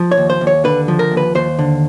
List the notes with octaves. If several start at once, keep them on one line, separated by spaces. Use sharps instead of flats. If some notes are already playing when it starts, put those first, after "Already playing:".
Already playing: F3
C#5
D#2
C5
D#2
C#5
D3 B4
F3
A#4
D#2
B4
D#2 C5
D3